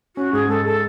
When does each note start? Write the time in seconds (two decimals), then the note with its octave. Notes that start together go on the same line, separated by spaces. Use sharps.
0.16 C#4 F#4
0.33 G#2 G#4
0.48 G#3 A4
0.65 G#4 A4